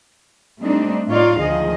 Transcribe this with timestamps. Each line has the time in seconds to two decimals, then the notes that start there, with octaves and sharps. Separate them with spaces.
0.61 G3 A3 C4 D4 D#4
1.09 A2 D#4 F4 C#5 D5 F5
1.39 D2 D#3 F3 G#4 D#5